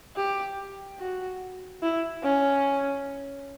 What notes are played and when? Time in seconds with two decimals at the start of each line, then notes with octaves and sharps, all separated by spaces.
0.16 G4
0.99 F#4
1.82 E4
2.23 C#4